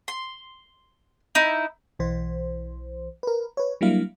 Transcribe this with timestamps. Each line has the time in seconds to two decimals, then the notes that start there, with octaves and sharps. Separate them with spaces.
0.08 C6
1.35 D#4 E4
1.99 B1 E3 C5
3.23 A#4 B4
3.57 B4 C#5
3.81 F#3 G3 A#3 D4 E4 F5